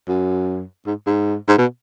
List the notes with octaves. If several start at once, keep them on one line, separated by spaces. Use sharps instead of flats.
F#2
G#2
G#2
G#2
B2